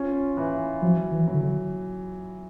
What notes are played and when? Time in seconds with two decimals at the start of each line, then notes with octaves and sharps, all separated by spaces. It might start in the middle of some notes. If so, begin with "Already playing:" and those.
Already playing: C#4 F4
0.37 E3
0.81 F3 F#3
1.12 E3
1.27 F#3
1.34 D3